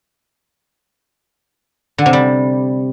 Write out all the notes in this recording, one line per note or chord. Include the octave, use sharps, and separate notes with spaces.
D3
C3
G3